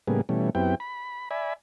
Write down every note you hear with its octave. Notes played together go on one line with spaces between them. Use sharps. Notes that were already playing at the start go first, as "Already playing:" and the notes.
A2 C#3 G3 A#3 B3 G#4
B2 E3 G3 A3 C#4
F#2 B3 C4 E4 G4 G5
B5
D5 E5 G#5 B5